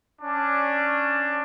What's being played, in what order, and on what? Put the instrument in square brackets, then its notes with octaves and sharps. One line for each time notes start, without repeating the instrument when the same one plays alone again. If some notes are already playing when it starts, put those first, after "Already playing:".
[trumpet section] C#4 D4